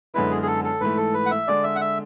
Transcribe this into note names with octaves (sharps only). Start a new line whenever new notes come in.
F#2 D3 G#3 B3 E4 B4
G#4
G#4
A4
A4
G#2 E3 A3 B4
A4
B4
F#5
E5
D3 G#3 D4 D5
E5
F#5
E5